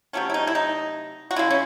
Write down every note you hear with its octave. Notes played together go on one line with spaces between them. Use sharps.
C3 F#3 A3 C#4
E4
D#4
E4
D#4
F#4
C#3 G#3 E4
C#4